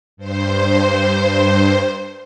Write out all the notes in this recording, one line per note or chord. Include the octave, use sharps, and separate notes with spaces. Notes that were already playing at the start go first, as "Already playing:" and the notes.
G2 C5